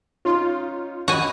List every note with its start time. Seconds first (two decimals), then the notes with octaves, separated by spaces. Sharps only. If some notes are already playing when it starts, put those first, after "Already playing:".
0.25 C#4 D#4 F4
1.08 C#4 F#4 D#5 G#5 B5